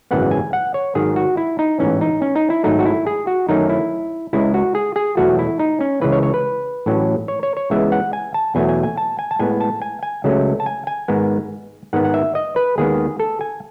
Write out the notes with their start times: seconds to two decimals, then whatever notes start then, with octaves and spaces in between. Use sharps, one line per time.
0.11 G#1 F#2 C#3 E3 B3 F#5
0.31 G#5
0.53 F#5
0.74 C#5
0.95 G#2 D#3 F#3 G#4
1.16 F#4
1.37 E4
1.59 D#4
1.79 A1 G#2 E3 C#4
2.01 D#4
2.22 C#4
2.36 D#4
2.50 E4
2.64 G#1 G#2 F#3 A3 D#4
2.79 F#4
2.86 E4
3.07 G#4
3.27 F#4
3.48 F#2 D#3 F#3 A3 C#4 D#4
3.69 E4
4.33 C#2 C#3 G#3 E4
4.54 F#4
4.75 G#4
4.96 G#4
5.17 E2 B2 F#3 A3 F#4
5.39 E4
5.59 D#4
5.81 C#4
6.01 C#2 C#3 E3 B4
6.12 C#5
6.23 C#5
6.34 B4
6.86 A1 A2 F#3 C#4
7.28 C#5
7.43 C#5
7.57 C#5
7.70 C#2 C#3 E3 G#3 B3 E5
7.92 F#5
8.13 G#5
8.34 A5
8.55 E2 B2 F#3 A3 G#5
8.69 G#5
8.83 G#5
8.98 A5
9.19 G#5
9.31 A5
9.39 A2 G#3 B3 G#5
9.61 A5
9.82 G#5
10.03 G#5
10.24 C#2 C#3 F#3 A3 C#4
10.60 A5
10.66 G#5
10.87 G#5
11.08 G#2 D#3 G#3 B3
11.93 G#2 D#3 G#3 B3 F#5
12.04 F#5
12.14 E5
12.35 D#5
12.56 B4
12.78 D#2 D#3 G#3 B3 G#4
13.20 A4
13.41 G#5